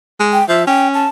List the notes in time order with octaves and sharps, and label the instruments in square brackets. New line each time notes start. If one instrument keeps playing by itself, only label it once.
[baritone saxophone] G#3
[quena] G5
[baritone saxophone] F3 [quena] E5
[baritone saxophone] C#4 [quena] G5
[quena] A5